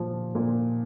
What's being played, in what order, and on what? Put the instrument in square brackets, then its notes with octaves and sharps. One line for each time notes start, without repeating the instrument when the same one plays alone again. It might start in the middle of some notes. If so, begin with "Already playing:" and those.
Already playing: [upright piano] A#2 F3
A#2